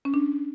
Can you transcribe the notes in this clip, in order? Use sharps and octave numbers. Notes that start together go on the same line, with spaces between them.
C#4
D4